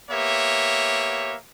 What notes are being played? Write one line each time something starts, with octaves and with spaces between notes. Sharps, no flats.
A#3 B3 G4 C#5 E5